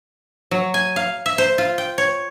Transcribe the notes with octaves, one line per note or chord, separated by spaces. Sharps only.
F#3
G#5
F5
E5
C5
F4
G5
C#5